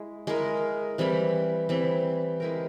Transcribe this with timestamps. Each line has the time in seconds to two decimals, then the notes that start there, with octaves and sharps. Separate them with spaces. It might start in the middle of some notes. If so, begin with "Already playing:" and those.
Already playing: G#3 E4
0.27 G#3 E4 A#4
0.98 E3 G3 C4 E4
1.69 E3 G3 C4 E4
2.40 G#3 E4 G4 A#4